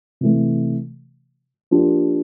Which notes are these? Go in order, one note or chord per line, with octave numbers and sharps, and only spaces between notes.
C3 E3 A3
F3 A#3 D4 G4